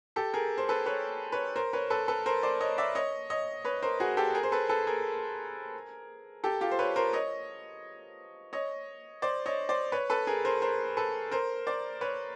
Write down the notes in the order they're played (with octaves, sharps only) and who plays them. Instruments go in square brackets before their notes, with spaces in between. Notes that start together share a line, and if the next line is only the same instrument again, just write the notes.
[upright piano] G4 A4
G#4 A#4
C5
A4 B4
B4 C#5
B4 C#5
A#4 C5
B4 C#5
A4 B4
A4 B4
A#4 C5
C5 D5
C#5 D#5
D5 E5
C#5 D#5
C#5 D#5
B4 C#5
A#4 C5
F#4 G#4
G4 A4
G#4 A#4
C5
A4 B4
A4 B4
G#4 A#4
G4 A4
F4 G4
C5
B4 C#5
A#4 C5
C#5 D#5
C#5 D#5
C5 D5
C#5 D#5
C5 D5
B4 C#5
A4 B4
G#4 A#4
A#4 C5
A#4 C5
A4 B4
A#4 C5
C5 D5
B4 C#5